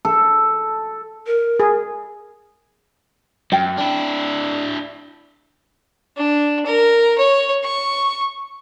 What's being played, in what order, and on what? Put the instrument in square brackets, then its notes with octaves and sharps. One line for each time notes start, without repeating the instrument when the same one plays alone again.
[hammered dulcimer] A4
[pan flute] A#4
[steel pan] G#4
[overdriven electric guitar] F#2 [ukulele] G5
[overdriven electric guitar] D4 E4
[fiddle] D4
A#4
C#5
C#6